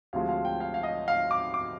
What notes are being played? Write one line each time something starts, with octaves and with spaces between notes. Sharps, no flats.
D2 C3 F3 G#3 F5
F5
G5
F5
F5
D#5
F5
D6
D6